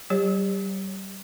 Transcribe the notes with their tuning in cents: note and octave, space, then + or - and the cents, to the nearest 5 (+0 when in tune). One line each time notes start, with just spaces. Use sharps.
G3 -30 G4 +30 C#5 -5